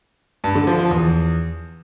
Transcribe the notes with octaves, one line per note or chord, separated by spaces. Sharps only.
G2
D3
F3
F3
E2